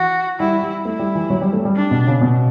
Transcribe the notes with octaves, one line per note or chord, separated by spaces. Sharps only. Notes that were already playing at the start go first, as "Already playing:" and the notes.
Already playing: E3 F#4
G3 E4
G3
A3 E4
G3
E3
F#3
G3
A3
G3
D4
B2
C#3
B2